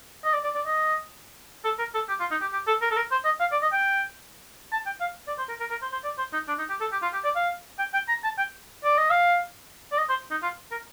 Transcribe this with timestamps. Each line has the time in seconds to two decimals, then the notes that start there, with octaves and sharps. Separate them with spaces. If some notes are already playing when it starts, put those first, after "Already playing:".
0.25 D#5
0.33 D5
0.44 D5
0.55 D5
0.66 D#5
1.64 A4
1.79 A#4
1.94 A4
2.09 G4
2.20 F4
2.31 D#4
2.41 G4
2.53 G4
2.67 A4
2.82 A#4
2.91 A4
2.96 A#4
3.11 C5
3.25 D#5
3.40 F5
3.52 D5
3.62 D#5
3.73 G5
4.72 A5
4.86 G5
5.01 F5
5.27 D5
5.38 C5
5.49 A#4
5.60 A#4
5.70 A#4
5.82 C5
5.92 C5
6.04 D5
6.18 C5
6.33 D#4
6.48 D4
6.59 D#4
6.69 G4
6.80 A4
6.92 G4
7.02 F4
7.13 G4
7.24 D5
7.36 F5
7.79 G5
7.94 G5
8.08 A#5
8.24 A5
8.38 G5
8.84 D5
8.98 D#5
9.10 F5
9.92 D5
9.98 D#5
10.09 C5
10.31 D#4
10.43 F4
10.72 A#4